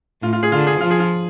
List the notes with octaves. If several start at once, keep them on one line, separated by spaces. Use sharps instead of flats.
A2 F4
F4
G#4
D3 F4
G#4
F3 F4
G#4
F4